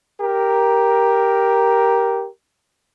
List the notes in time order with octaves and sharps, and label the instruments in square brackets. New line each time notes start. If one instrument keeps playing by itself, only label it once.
[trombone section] G4 A#4